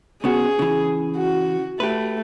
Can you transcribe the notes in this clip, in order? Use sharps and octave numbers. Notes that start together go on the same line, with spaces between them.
C#3 B3 F#4 G#4
C#3 E3
F#4
A3 G4 B4